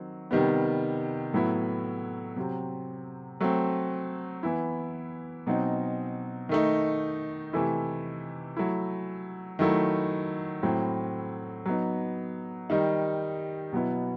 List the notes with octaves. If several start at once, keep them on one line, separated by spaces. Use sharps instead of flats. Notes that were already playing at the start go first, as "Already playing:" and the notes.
Already playing: D#3 F#3 C4
C3 D#3 G3 B3
A2 F#3 B3 E4
C3 F#3 C4
F#3 A3 C4
E3 B3 E4
B2 F#3 C4 D#4
D#3 A3 D#4
C3 E3 A3 E4
F#3 A3 E4
D#3 F#3 A3 E4
A2 F#3 C4 E4
F#3 B3 D#4
D#3 G3 D#4
B2 F#3 B3 E4